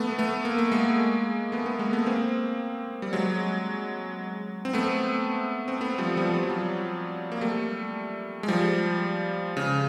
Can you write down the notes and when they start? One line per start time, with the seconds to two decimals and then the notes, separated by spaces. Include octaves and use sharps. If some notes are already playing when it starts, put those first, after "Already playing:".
Already playing: A3 B3
0.19 A3 B3
0.45 A#3
0.58 A3
0.72 G#3 A#3
1.52 A3 B3
1.66 A3 B3
1.79 G#3 A#3
1.93 A3 B3
2.06 A#3 C4
3.02 G3
3.13 F#3 G#3
4.65 C4
4.73 A3 B3
5.68 C4
5.81 A3 B3
5.98 F3 G3
6.17 F3 G3
6.34 G3
6.43 F#3
6.50 F3 G3
7.32 A#3
7.41 G3 A3
8.43 G#3
8.48 F3 G3
9.57 C#3